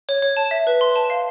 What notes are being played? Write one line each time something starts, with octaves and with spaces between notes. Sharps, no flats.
C#5
C#5
A5
E5
B4
C6
A5
F5